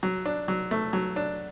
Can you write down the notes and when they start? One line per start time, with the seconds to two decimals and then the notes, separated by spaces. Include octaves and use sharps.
0.03 F#3
0.25 D4
0.48 F#3
0.71 A3
0.93 F#3
1.16 D4